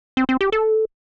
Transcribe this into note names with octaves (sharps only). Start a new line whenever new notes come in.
C4
C4
G4
A4